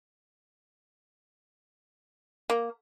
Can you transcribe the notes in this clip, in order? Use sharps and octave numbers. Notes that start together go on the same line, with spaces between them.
A#3